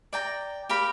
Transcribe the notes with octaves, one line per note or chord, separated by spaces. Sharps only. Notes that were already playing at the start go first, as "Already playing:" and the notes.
D5 G5 A#5
G4 A#4 F5 B5